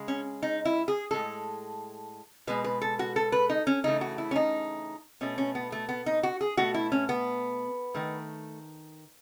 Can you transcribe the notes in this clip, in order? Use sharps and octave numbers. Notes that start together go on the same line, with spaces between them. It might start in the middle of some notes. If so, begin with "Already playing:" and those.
Already playing: C#3 G#3
C#4
D#4
E4
G#4
A2 G#3 A4
B2 G#3 B4
B4
A4
F#4
A4
B4
D#4
C#4
C#3 E3 A3 D#4
F#4
E4
C#4
D#4
B2 A3 C#4
C#4
B3
A3
B3
D#4
F#4
G#4
B2 A3 F#4
E4
C#4
B3
D#3 A3